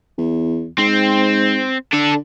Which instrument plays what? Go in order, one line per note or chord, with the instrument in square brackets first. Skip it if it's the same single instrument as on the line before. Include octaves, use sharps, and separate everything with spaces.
[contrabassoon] E2
[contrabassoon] G#2 [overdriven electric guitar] C4
[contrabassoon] D3 [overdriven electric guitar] D4 A4